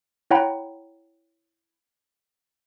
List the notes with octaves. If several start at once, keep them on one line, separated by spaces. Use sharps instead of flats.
E4 C#5 F#5 G5 A#5 B5